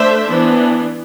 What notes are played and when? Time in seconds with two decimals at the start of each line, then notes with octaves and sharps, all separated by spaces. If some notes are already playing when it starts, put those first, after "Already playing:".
Already playing: A3 D4 C5 E5
0.28 E3 B3 D4